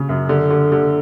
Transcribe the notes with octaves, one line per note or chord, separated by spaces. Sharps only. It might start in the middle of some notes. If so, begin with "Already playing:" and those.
Already playing: C#3
F#2
D3
D3
D3